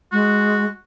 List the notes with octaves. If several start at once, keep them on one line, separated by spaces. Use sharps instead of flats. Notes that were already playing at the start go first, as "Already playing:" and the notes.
G#3 F#4